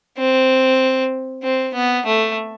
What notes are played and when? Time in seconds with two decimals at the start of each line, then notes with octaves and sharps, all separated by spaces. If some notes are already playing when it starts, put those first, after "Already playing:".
0.18 C4
1.43 C4
1.74 B3
2.06 A3